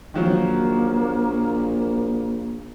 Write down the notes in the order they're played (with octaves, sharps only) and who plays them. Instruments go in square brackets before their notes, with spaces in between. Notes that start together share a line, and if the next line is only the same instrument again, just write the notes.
[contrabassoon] A#1 [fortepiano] D#3 F3 F#3 [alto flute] A#3